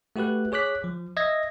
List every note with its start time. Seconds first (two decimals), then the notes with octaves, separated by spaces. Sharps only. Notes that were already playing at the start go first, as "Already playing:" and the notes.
0.16 A3 F#4 G4 B4 F#6
0.52 G#4 C#5 D6 F#6 B6
0.84 F3
1.17 D#5 E5 G#6 A#6